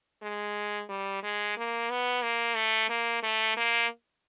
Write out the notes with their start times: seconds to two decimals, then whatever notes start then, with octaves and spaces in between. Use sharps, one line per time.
0.23 G#3
0.89 G3
1.23 G#3
1.57 A#3
1.90 B3
2.22 A#3
2.56 A3
2.89 A#3
3.23 A3
3.57 A#3